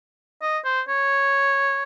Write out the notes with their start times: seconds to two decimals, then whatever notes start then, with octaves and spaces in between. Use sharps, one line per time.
0.42 D#5
0.65 C5
0.88 C#5